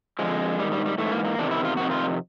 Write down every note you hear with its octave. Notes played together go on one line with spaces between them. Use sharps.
F2 D3 F3 G#3
G#2 D#3 G3
G3
G3
G#2 E3 A3
A#3
A#3
E2 C3 D#3 D4
E4
F4
F2 C3 D#3 F#4
F4